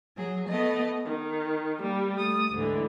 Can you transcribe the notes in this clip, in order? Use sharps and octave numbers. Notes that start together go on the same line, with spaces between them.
F#3 G#4
A3 B3 D#5
D#3
G3 A#3
A3 D#6
D2 G#2 D3 E3